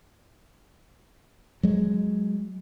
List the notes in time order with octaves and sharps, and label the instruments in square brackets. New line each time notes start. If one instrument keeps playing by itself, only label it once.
[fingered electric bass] F#3 G#3